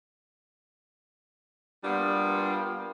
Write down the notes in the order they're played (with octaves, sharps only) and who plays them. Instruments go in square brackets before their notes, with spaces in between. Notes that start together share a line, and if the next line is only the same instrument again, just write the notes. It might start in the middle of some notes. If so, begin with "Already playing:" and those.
[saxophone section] G3 A#3 B3 D4 F4